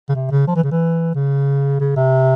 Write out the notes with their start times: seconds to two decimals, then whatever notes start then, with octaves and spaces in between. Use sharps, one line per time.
0.09 C#3
0.15 C3
0.31 C#3
0.48 F3
0.56 E3
0.63 C#3
0.71 E3
1.15 C#3
1.80 C#3
1.96 C3